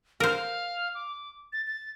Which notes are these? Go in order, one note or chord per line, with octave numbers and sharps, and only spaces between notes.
A#4 C5 F5
D6
A6
A6